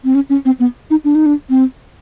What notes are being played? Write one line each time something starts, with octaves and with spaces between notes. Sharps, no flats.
C4
C#4
C#4
C4
B3
D#4
D4
D#4
D4
C4